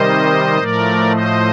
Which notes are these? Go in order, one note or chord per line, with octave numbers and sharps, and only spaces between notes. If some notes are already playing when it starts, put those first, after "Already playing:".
Already playing: C3 D#3 G3 C5 D#5
A2 F3 A3 A#4 D5
C5 D#5